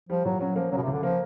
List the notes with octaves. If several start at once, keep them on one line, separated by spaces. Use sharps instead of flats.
F3 G3
A#2 F#3
F#3 C#4
F3 A#3
C#3 F#3
B2
C3
C#2 D3
F3 A#3